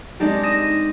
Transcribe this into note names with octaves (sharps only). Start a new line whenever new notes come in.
G#3 C4 D4 D#4 G4
D#6 A#6 D#7 E7